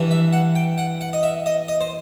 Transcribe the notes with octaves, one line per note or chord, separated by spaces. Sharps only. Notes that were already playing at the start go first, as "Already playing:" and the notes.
Already playing: G2 E3
E5
F#5
G5
F#5
F#5
D#5
E5
D#5
D#5
C5